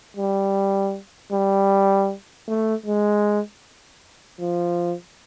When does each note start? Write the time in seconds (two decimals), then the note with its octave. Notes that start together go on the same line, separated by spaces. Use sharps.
0.17 G3
1.32 G3
2.48 A3
2.86 G#3
4.40 F3